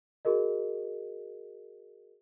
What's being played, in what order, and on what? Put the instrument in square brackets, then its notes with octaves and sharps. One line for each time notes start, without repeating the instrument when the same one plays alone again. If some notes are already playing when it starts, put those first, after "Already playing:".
[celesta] F#4 G#4 A#4 D#5